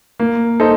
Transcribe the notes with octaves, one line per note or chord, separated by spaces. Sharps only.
A#3
D#4 A4 C5 D#5